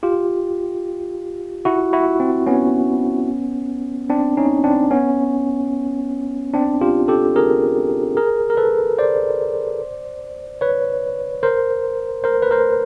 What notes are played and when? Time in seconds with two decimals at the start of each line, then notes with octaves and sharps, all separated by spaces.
0.03 F4 G4
1.65 E4 F#4
1.93 E4 F#4
2.20 C4
2.47 B3 C#4
4.10 C4 D4
4.37 C#4 D#4
4.64 C4 D4
4.91 B3 C#4
6.54 C4 D4
6.81 F4 G4
7.08 G4 A4
7.36 G#4 A#4
8.17 G#4 A#4
8.50 A#4
8.57 A4 B4
8.98 C5 D5
10.61 B4 C#5
11.43 A#4 C5
12.24 A#4 C5
12.42 B4
12.51 A#4 C5